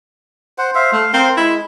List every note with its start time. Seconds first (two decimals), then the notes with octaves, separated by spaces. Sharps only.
0.58 C5 F#5
0.75 C5 E5 F5
0.92 A3 F5
1.13 C4 A#4 C5 F5
1.37 G#3 E4